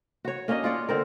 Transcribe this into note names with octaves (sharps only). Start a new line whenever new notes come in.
F#4 C#5
A#3 C#4 D4 D#5
F4 C#5 D5 F#5
D3 C4 A#4